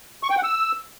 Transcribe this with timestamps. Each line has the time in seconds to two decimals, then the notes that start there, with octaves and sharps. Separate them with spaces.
0.23 C#6
0.30 G5
0.37 F#5
0.43 E6